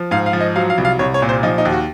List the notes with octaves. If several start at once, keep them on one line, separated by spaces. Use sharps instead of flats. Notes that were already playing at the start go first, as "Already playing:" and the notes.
Already playing: F3
G#2 F5
F5
F3
D#5
F#3 F5
F5
C2
F5
C2 C#5
C#5
A#2
C5
F3 D#4
D#4
D#2
F#4